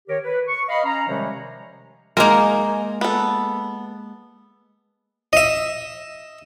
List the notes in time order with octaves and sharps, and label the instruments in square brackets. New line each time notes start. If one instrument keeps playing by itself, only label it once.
[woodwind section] D#3 G4 A#4 C#5
B4
C#6
D#5 F5 B5
C#4 A#5
C3 D#3 F3 G3 G#3 C#4
[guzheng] G#3 A#3 [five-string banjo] D#4 G#4 A#4
[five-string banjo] B3 A4
[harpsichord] D#5 E5